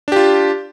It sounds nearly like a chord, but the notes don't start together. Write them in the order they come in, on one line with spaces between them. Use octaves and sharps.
D4 G4 F4